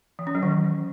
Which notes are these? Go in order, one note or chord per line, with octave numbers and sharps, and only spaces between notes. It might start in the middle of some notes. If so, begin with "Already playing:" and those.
E3
C#4
F#3
D#3